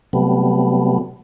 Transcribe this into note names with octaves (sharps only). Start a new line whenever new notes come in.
C3 F#3 G3 A3 B3